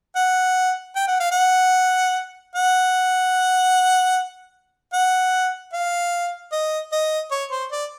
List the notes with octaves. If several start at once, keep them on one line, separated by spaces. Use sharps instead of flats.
F#5
G5
F#5
F5
F#5
F#5
F#5
F5
D#5
D#5
C#5
C5
D5